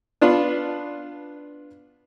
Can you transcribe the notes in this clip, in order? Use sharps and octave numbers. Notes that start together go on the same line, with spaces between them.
B3 D4 F4 B4